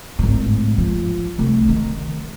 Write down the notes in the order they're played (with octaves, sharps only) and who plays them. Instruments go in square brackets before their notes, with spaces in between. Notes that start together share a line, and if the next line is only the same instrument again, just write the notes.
[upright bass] G#1 A2
F3
C2 A3
D#3